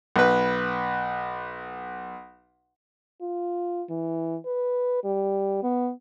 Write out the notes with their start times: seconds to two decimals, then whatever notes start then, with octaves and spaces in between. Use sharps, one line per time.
0.16 B1 B4
3.21 F4
3.90 E3
4.46 B4
5.04 G3
5.63 B3